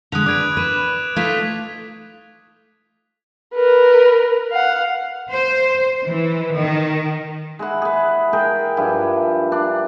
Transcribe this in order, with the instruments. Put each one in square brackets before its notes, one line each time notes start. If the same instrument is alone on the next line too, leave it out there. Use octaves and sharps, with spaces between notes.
[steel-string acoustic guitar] D3 G#3 [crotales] D#6 F#6 F7
[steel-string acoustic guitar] D4 B4 [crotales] D6 G#6 D7
[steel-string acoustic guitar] B4 [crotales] G#6 E7
[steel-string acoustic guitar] A3 D#4 F4 [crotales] G#6 B6 F7
[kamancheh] A#4 B4
F5 F#5
[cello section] C5
E3
D#3
[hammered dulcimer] G#3 E4 F#5
G#4 B4
G#3 G#4 A#4 G5
G2 F3 E4
D4